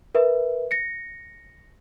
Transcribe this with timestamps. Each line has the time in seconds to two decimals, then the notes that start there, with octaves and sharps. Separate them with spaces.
0.15 A#4 B4 E5
0.71 A#6 C#7